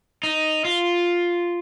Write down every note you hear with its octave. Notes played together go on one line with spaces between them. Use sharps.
D#4
F4